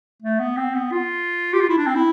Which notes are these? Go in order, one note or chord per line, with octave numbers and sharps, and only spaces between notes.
A3
B3
C4
B3
F4
G4
F4
E4
D4
C4
E4